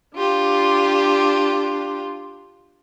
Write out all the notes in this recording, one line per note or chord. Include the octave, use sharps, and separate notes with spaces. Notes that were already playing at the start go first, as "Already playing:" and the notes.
D4 F4 G4